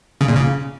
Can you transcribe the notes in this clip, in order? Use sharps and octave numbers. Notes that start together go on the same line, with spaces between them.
C#3
A#2
C#3